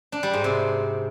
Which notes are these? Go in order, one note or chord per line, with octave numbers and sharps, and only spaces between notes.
D4
G3
G#2
C3